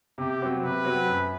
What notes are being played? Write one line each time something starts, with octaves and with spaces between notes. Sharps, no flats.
C3 G4
F#3 C4 F#4
C3 B4
F#3 C4 F#4
F#2